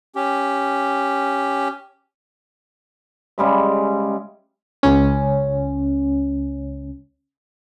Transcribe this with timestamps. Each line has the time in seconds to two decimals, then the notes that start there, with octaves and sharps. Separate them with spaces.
0.16 C#4 G4
3.38 C#3 G3 G#3 E5
4.83 C#2 C#4